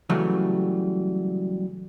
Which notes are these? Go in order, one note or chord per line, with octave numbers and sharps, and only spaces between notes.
C#3 E3 F#3 G3 A3